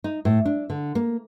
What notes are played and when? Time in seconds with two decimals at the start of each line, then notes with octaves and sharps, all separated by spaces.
0.04 D#4
0.25 A2
0.46 D4
0.70 D3
0.95 A#3